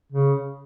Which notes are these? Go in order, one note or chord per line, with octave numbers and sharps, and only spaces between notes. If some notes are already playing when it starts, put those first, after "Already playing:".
C#3